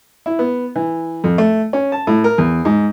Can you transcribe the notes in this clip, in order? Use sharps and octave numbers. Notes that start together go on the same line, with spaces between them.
E4
B3
E3
F2
A3
C#4
A5
A2
A#4
E2
G#2